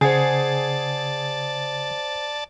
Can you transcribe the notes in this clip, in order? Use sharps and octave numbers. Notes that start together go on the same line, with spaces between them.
C#3 G#4 C5 D5 F#5 A5 G#6